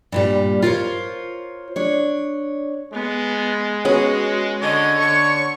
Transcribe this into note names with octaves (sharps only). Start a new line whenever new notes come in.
G2 A#2 G3
F4 A#4 C5 C#5
D4 C#5
G#3 B3
B3 C#4 F#4 G#4
D3 C#5 D#5
D3 C#6